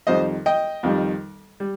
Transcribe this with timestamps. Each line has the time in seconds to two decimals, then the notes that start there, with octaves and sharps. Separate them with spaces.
0.07 F2 D#3 G3 C5 D#5
0.46 D#5 G5
0.83 F2 D#3 G3
1.60 G3